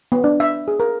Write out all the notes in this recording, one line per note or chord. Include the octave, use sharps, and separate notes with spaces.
B3
D4
E5
G#4
A#4